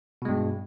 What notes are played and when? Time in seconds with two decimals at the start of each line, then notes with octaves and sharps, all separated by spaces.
0.22 B2
0.25 G#3
0.29 G2